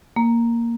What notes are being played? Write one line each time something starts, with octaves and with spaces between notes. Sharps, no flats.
A#3